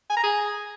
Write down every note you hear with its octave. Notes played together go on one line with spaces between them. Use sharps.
G#5
A#5
G#4